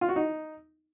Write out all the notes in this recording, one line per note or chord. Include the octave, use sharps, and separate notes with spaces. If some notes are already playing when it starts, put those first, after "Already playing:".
F4
F#4
D#4